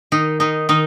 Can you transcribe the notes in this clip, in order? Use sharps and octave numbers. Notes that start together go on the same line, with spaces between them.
D#3 D#4
D#3 D#4
D#3 D#4